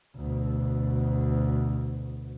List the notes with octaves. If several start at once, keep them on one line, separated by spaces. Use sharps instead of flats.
D2 B2